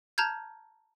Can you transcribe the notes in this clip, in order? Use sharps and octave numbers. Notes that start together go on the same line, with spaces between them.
A5 A#5 F6 G6 G#6